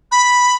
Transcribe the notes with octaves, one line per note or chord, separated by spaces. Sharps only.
B5